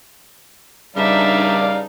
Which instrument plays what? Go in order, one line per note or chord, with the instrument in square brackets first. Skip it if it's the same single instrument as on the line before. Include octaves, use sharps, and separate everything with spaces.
[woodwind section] G2 C#3 G3 [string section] D4 D#4 [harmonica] D5 F5 [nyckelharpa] E5